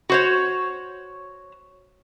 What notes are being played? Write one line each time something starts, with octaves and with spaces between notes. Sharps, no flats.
F#4 C5 C#5